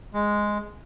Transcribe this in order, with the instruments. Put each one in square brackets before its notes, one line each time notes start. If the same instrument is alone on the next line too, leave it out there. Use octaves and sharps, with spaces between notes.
[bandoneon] G#3